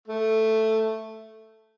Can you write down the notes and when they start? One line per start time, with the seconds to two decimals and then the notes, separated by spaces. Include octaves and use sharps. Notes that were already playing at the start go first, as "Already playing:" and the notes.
0.08 A3